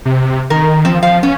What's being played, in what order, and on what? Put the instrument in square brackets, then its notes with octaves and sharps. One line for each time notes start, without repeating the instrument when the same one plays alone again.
[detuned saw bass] C3
[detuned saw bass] D#3 [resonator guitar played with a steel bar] A#4
[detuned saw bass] F3 [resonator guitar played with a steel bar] C4
[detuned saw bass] F3 [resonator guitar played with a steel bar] F5
[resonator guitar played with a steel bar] B3 [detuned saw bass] C#4